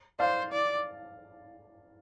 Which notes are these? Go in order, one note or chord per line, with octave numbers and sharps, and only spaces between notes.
C5 D5 F5
D5